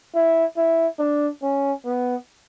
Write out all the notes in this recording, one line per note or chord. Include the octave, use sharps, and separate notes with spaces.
E4
E4
D4
C#4
B3